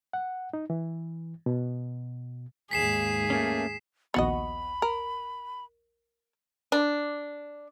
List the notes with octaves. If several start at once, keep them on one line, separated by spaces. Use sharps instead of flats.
F#5
D#4
E3
B2
D#2 G#2 G#4 B6 C7 E7
A3 A#3 C#4
A#1 D#2 B3 F#4 D#5 B5 C#6
A#4
D4